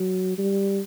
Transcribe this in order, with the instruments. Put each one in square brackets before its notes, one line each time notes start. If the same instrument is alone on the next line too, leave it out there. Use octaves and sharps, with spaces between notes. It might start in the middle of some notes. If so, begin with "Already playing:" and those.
Already playing: [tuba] F#3
G3